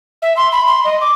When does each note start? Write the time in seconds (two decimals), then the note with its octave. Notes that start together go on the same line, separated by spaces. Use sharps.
0.22 E5
0.37 C6
0.52 B5
0.67 C6
0.84 D#5
1.01 D6